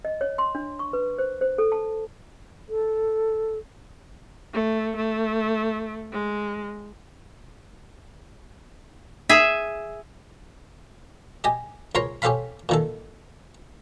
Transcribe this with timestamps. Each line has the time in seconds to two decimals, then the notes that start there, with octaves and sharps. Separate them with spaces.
0.05 D#5
0.21 C#5
0.38 C6
0.55 D4
0.79 C#6
0.93 B4
1.18 C5
1.41 C5
1.58 A4
1.72 A5
2.69 A4
4.54 A3
4.97 A3
6.12 G#3
9.29 G#4 E5
11.44 G4 D#5 G#5
11.95 C#2 A#4 C5 C#5 A#5 C6
12.22 C#4 G4 A4 C5 F5 B5
12.69 A#2 D#3 A4